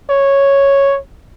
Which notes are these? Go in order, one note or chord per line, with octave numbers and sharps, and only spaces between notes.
C#5